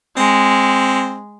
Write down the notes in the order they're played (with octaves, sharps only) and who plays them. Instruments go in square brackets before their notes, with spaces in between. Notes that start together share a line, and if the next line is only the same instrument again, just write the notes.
[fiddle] G#3 [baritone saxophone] C4